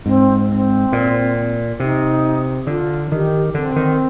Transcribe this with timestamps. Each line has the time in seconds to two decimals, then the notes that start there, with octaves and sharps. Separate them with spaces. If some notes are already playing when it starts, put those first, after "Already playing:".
0.05 G#2 C4
0.49 C4
0.92 A#2
1.80 C3 D#4
2.67 D3 F4
3.12 D#3 G4
3.54 D3 C4
3.76 D#3